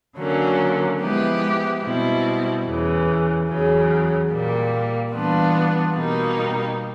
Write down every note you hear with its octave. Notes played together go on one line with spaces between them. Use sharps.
D3 F#3 A#3 C#4
F3 G#3 B3 E4 G4
B2 G3 C4 E4
E2 C#3 E3
E2 C#3 F#3
A#2 G3 A#3
E3 G3 B3 D4 F4
B2 G3 A#3 D#4